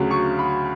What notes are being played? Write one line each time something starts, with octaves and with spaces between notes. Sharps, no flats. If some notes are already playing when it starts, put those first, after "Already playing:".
Already playing: D2 C#3 F#3
C#6
B5